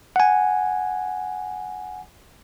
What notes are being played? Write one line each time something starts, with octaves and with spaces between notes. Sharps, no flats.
F#5 G#5